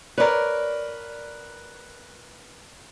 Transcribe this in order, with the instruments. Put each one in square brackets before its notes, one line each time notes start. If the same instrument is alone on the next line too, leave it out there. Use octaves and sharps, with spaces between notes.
[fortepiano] A#4 B4 [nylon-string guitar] C#5 D5